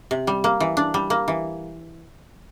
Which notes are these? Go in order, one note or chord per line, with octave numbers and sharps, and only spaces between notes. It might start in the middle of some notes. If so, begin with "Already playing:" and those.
C3
G3
A#3
E3
D4
G3
A#3
E3